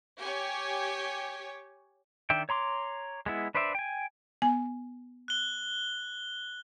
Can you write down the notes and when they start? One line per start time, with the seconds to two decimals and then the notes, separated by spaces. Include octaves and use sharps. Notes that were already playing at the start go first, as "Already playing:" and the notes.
0.21 G4 C#5 G#5
2.30 D#3 D4 E5 G5
2.49 C#5 A#5 C6 D6
3.26 G#3 B3 E4
3.55 D4 B4 C5 D5 E5
3.75 G5 G#5
4.42 B3 G#5
5.28 F#6 G7